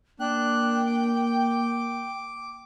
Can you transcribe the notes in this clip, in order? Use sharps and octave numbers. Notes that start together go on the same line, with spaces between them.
A#3 D4 G5 F#6
D6